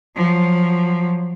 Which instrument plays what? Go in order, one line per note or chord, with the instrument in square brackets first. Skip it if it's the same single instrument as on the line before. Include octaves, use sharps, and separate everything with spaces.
[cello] F3 F#3